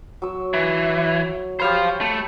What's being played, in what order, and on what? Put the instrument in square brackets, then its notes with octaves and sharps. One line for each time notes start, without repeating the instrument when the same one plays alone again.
[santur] F#3 E6
[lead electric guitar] E3
[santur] G4 C#5 B5 [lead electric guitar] C5 F5
[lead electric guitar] A3